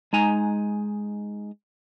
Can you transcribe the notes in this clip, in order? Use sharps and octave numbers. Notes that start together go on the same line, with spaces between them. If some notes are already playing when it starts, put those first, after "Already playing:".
G#3 D#4 G#5 A#5